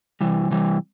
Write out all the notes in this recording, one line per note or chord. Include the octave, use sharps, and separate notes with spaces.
C3 E3 G3
C3 E3 G3